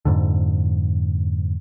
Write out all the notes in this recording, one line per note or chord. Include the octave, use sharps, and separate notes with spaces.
F2 G#2 D3